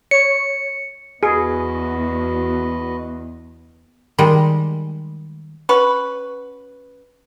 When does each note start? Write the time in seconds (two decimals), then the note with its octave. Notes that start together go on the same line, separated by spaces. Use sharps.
0.11 C#5 C#7
1.23 E2 F#4 G#4 B4 D#5
4.18 D#3 G3 G#3
5.69 C#4 F#4 B4